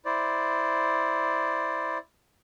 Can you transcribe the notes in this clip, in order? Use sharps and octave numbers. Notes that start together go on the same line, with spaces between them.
E4 C5 D5